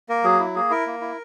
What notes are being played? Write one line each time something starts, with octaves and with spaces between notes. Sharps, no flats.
A#3 A#4
F#3 G#4
E4
A#3 G#4
E4 A#4
A#3
E4